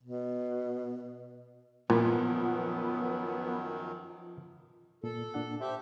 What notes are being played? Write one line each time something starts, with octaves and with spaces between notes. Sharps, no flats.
B2
F#2 A#2 D#3 F3 F#3 B3
A#2 A4
A#2 D4 F#5
G4 C5 E5 G5